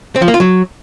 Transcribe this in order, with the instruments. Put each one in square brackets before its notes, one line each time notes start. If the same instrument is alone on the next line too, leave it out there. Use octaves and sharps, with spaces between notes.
[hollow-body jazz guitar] C4
F3
A#3
F4
F#3